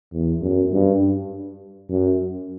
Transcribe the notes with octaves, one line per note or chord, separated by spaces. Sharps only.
E2
F#2
G2
F#2